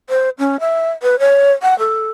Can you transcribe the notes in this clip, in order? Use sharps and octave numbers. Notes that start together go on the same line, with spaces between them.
C5
C#4
E5
B4
C#5
F#5
A4